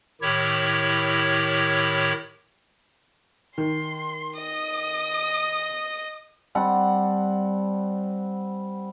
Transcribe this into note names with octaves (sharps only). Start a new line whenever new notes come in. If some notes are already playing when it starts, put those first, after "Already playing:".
A2 D#3 E4 G4 C#5 G#6
D#3 C6
D#5 D#6
G3 C4 F#5 A5